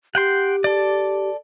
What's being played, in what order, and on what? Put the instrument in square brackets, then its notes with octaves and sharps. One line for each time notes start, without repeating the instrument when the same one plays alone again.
[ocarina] G4 [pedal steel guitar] F#5 G5 C6
[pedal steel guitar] A4 D5